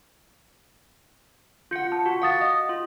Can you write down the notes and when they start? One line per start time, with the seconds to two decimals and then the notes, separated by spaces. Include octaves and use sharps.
1.71 F4 F#5 G6 C#7
1.92 A5
2.06 F#4 F#5
2.22 F5 F#5 D#6 A6
2.41 D#5
2.69 F4